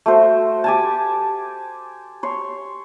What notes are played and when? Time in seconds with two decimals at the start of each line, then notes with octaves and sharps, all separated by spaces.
0.06 A3 F#4 C5
0.64 G4 G#5 A5
2.23 C#5 C6